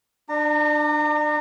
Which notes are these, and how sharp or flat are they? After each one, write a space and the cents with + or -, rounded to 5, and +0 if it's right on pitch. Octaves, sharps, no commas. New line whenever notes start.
D4 +30 A#5 -30